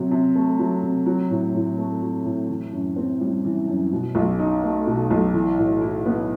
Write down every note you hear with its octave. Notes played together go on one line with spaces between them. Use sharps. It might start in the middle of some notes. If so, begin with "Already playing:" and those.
Already playing: C3 F#3
C3
A3
F#3
C3
F#3
A2
A2
A3
F#3
A2
E3
F#2
C4
G3
E3
F#2
B2
B1
D#4
A3
B2
B1
E3
A2
E4
B3